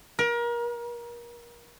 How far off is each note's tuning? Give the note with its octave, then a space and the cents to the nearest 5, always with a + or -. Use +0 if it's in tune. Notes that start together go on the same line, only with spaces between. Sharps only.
A#4 +30